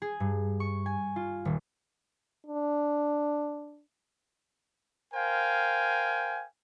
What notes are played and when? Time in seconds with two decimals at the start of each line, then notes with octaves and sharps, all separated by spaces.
0.02 G#4
0.20 G2
0.60 C#6
0.86 G#5
1.16 F4
1.45 D#1
2.46 D4
5.14 A#4 C5 F5 G5 G#5